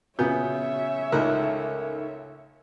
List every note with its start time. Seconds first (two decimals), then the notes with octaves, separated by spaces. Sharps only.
0.19 A#2 C#3 B3 F#4 C#5 E5 G#5 G6
1.12 C#2 A2 D#4 A4 A#4 F#6